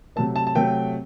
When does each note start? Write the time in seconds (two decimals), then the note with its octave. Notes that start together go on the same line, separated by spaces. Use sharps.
0.16 C3 F#3 A3 A5
0.36 A5
0.47 A5
0.55 C3 F#3 A3 G5